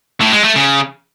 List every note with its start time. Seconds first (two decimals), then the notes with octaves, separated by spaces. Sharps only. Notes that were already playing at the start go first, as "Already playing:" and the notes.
0.21 A2
0.32 G#3
0.44 A3
0.56 C#3